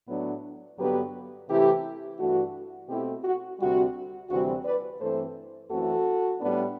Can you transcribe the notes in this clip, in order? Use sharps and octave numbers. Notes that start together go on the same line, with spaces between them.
A2 F#3 B3 D4
G2 D3 F#3 B3 G4 B4
C3 E3 A3 E4 G4
G2 E3 A3 D4 F#4
B2 A3 C4 E4 G4
F#4
D2 C3 G3 F#4
D2 C3 E3 G3 C4 F#4
B4 D5
G2 E3 A3 C4 A4 C5
F#2 E3 A3 C4 F#4 A4
A2 G3 B3 D4